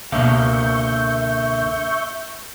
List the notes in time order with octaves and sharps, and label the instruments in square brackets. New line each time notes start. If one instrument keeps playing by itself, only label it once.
[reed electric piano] C#2 B2 [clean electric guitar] D3 A#3 F5 [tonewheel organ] E5 C#6 G6